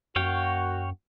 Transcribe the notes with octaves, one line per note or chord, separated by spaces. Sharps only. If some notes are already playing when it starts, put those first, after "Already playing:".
F#2 A#3 F#4 C#5 F5 G5